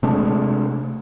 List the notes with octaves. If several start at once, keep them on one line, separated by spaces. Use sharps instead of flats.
C3 G#3 A3 D4